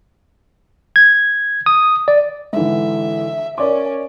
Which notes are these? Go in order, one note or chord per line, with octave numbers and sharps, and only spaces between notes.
G#6
D#6
D5
G#2 D3 E3 E5
C#4 A#4 D5 D6